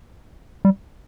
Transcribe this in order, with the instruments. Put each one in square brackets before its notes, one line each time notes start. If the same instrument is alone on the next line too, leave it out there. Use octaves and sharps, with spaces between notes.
[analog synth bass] G3